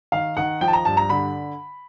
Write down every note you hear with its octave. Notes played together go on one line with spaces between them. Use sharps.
D#3 F5
D#3 F#5
F3 G5
A5
A#5
G2 A5
A#5
D3 B5